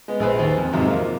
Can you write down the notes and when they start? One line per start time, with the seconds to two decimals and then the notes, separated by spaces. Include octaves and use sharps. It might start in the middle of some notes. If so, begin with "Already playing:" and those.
0.08 G#3 B3
0.20 A#1 G#4 B4 C5
0.39 D#2
0.57 F2
0.73 F2 G#2 C3 F3 F#3
0.87 A#3 F4